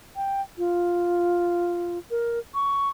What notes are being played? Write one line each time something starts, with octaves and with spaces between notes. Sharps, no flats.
G5
F4
A#4
C#6